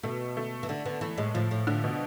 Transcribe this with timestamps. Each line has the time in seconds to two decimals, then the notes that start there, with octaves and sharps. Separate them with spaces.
0.03 B2 A3
0.37 A3
0.63 E3
0.69 D3 A3
0.85 D3 B3
1.01 E3 A3
1.17 A2 G#3
1.34 A2 F3
1.51 A2
1.67 A2 D3
1.84 B2